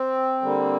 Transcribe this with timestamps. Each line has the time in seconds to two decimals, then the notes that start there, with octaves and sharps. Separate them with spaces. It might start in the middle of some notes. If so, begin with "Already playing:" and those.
Already playing: C4
0.42 D3 G3 A#3